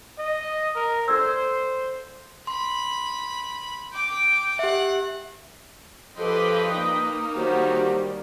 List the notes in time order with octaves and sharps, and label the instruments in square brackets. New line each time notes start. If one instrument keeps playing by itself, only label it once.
[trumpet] D#5
A#4
[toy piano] A4 D5 E6 [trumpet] C5
[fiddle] B5 [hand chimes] C6
[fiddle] G5 D6
[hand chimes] G4 E5 [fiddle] F#5
[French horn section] G2 F3 [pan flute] A4 [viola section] B4 D#5 G5 [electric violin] C6 D6
[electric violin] A#3 D#4 [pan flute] D#6
[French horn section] D3 F#3 F#4 [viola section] D#3 G3 G4 [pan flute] C5